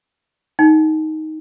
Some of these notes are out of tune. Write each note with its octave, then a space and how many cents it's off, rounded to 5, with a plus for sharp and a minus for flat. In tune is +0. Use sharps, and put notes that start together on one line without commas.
D#4 +10 G5 +0